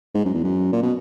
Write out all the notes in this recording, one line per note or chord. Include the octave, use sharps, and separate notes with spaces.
G#2
F#2
E2
F#2
A#2
B2